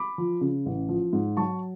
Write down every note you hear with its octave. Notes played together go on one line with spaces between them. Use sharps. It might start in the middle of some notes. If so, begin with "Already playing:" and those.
Already playing: B5 D6
F3
C#3
A1
F3
G#2
F#3 A5 C#6